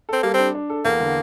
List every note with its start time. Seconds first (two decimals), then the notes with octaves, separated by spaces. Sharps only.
0.09 C4 A4
0.23 G3 A#3
0.34 C4 D4
0.55 D4
0.70 A4
0.85 E2 A#3
1.00 D3